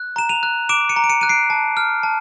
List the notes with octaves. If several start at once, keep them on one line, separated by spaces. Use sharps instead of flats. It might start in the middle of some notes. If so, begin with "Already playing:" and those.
Already playing: F#6
A#5 E7
D#7 F7
F#6
D6 D7 E7
C#7 D#7
A#5
D7
C#7 D#7
F#6 D#7
C7 D7
A5
F6
A5